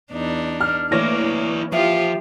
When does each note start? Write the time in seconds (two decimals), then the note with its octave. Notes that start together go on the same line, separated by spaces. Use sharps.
0.12 E2 D4 D#4
0.61 F6
0.92 E3 A3 A#3 E4 C#5 D5 A#6
1.73 F3 F4 G4 E5